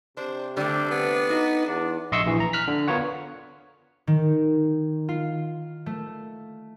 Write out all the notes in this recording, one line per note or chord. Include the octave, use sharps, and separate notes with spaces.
C3 D4 C5
D3 G3 A3 D4
C3 B3
D#4 F#4
E2 D4
A#1 D#5 E5 C6 C#6 E6
A#1 E3
A#5
F6 F#6 B6
D3
B3 F4 A#4 C#5 F#5
D#3
F4
A3